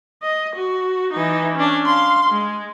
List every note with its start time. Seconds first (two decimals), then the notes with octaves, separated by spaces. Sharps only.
0.23 D#5
0.55 F#4
1.13 E3 D#4
1.55 C#4 D4
1.86 F5 C6
2.30 G#3